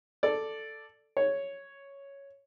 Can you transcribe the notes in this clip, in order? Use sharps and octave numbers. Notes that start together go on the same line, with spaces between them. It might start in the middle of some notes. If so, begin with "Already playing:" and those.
A4 D5
C#5